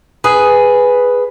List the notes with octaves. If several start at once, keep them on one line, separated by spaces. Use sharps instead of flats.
G#4 B4